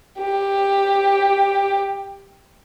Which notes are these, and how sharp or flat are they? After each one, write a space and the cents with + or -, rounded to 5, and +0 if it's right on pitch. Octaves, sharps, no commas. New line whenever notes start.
G4 +10